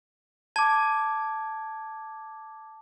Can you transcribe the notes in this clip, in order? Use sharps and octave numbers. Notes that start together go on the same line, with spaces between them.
A5 D6 G#6